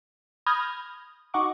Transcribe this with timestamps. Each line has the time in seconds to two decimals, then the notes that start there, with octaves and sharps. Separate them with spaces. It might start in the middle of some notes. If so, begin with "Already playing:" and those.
0.46 B5 D#6 F6 G6 G#6 A#6
1.34 D#4 F#4 D#5 F#5 C#6 D6